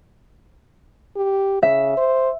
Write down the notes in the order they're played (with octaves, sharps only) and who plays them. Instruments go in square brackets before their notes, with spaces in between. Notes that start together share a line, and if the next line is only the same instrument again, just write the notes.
[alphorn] G4
[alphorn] C#3 [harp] E5
[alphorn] C5